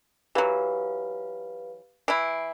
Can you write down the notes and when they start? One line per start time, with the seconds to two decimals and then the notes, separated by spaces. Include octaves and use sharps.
0.35 E3 F#3 G4 B4 F5
2.08 E3 E4 C7 D7